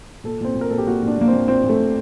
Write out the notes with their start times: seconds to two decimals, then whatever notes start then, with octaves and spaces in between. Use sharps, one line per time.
0.24 A#2 A4
0.41 A#2 C4
0.55 A#2
0.61 A#4
0.70 A#2 A4
0.78 G4
0.87 A#2 F#4
1.03 A#2 D4
1.17 A#2 A#3
1.28 C4
1.33 A#2
1.48 A#2 C4
1.64 A#2
1.69 A3
1.80 A#2